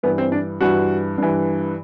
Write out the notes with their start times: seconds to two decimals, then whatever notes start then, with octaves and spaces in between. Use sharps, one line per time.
0.03 G2 E3 B3
0.18 C4
0.32 D4
0.61 G2 E3 F#4
1.18 G2 E3